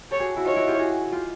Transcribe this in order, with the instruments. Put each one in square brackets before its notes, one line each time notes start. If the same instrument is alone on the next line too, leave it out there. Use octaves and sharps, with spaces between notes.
[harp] G4 A4 [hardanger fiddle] C#5
[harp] F#4 G#4
E4 F#4
[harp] D#4 F4 [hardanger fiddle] C#5
[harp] E4 F#4
F4 G4
F#4 G#4
F4 G4